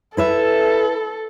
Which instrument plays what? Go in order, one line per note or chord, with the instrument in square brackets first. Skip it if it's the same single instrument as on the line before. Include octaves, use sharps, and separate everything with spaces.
[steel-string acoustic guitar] E4 B4 E5 [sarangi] A4